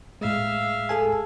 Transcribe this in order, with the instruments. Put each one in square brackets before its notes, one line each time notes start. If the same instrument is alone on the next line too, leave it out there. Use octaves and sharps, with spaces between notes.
[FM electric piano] A2 G#3 [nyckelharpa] E5 F5
[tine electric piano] G#4 A4 G#5